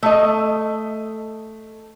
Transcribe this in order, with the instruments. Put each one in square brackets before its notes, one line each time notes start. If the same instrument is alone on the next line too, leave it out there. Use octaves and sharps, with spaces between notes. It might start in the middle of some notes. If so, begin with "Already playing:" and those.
[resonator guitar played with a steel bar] A3 D#5